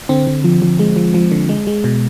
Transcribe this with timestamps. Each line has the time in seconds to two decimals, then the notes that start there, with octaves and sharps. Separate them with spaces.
0.09 D3 C4
0.27 D3
0.44 F3
0.62 F3
0.79 G#3
0.96 F3
1.14 F3
1.32 D3
1.49 G#3
1.67 G#3
1.84 B2